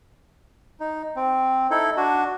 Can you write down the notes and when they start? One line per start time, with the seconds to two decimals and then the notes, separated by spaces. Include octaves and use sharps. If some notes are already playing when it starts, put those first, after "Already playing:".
0.80 D#4
1.16 C4
1.71 D#4 E4 A4
1.97 D4 F#4